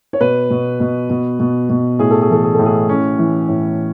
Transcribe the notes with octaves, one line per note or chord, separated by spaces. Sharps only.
C#5
B2 B4
B2
B2
B2
B2
B2
A2 G#4
A4
G#4
E3 A4
G#4
A2 A4
G#4
A2 C#4
E3
A2